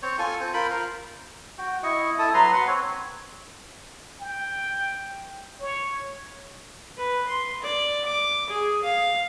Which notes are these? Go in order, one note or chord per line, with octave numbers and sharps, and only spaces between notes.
C4 C5 C#5
F4 A4 G#5
C4 C5
F4 A#4 C5 B5
A#4 C5 F5
F#4 G5
E4 D#5 C#6
E4 A4 A5 D#6
F#3 B4 A#5 C6
B4 F#5 C6
C4 C#5
G5
C#5
B4
C6
D5
D6
G#4
F5